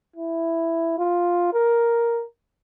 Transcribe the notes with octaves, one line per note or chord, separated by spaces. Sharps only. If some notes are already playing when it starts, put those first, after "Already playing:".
E4
F4
A#4